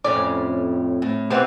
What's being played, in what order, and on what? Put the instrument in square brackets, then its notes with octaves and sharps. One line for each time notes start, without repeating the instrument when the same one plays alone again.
[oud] F2 A2 C#4 [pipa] D5
[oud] A2
[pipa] E3 C5 [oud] B3 C4 G4